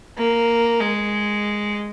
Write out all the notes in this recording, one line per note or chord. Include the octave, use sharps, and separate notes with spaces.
A#3
G#3